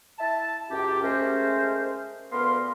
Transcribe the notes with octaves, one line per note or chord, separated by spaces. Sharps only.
E4 E5 A5
C#2 F#2 G4
G#3 A3 C#4 A#4 C5
D2 B3 A#4 F5 C6